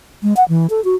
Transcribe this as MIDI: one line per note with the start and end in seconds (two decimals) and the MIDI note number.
0.23 0.33 56
0.37 0.44 78
0.49 0.67 52
0.70 0.83 69
0.84 0.95 66